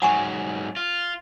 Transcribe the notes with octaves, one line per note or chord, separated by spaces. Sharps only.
G#2 F#3 F#5 G#5 C#6
F4